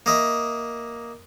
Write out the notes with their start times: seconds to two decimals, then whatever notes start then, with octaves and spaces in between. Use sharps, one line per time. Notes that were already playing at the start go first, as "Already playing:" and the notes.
0.06 A#3 D#5 E5